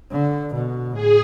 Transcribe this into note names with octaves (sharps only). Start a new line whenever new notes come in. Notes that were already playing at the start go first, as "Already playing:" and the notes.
D3
B2
A2 G#4